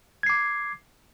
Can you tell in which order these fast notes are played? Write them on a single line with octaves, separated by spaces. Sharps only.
G#6 C7 D6